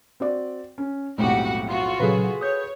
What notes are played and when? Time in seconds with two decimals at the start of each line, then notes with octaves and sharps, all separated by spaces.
0.20 C4 F#4 D5
0.78 C#4
1.18 B1 F2 A2 G#3 F#4 G4 F#5
1.66 F4 F#4
2.00 A#2 C#3 F#3 G#4 A4 B4
2.41 C#5 D#6 G6